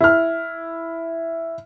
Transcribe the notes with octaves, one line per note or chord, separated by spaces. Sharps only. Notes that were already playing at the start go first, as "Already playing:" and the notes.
E4 F6